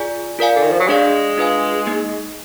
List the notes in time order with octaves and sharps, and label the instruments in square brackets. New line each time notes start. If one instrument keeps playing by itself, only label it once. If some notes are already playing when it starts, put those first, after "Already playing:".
Already playing: [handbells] F4 G#4 D5 G#5
F4 A#4 D5 F5 G#5
[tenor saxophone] D3
D#3
F3
F#3
[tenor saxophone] G#3 [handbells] D4 G#4 D5 F5
[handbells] D4 F4 B4 F5 G#5
A#3 D#4 G#4 D#5